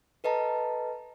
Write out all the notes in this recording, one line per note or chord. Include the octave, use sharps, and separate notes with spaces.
A4 B4 D#5 A5 A#5